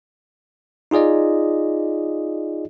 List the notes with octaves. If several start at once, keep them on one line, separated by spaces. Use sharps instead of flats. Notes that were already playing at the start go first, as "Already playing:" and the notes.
D#4 F4 G#4 D5 D#5